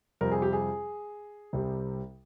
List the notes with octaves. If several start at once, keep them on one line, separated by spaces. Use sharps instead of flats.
F2 C3 G3 A#4
G#4
G4
G#4
C2 C3 G3